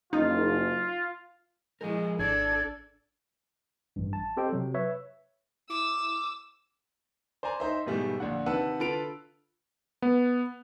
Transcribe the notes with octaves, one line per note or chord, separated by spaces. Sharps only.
F#1 D#4 F4
F3 G#3 E4 A#4
G#1 D4 A4 D5 G#6
A1 G2
A5
C4 G4 A4 C5 D#5 G5
C3 F#3
B4 C#5 E5
E4 D6 E6
C5 D5 G#5 A#5
D#4 C5 E5
G#2 B2 E3 G3 A3
A#1 D3 F#5
C3 D#3 B4 F#5 A5 E6
D3 F4 A4 B4 D7 F7
B3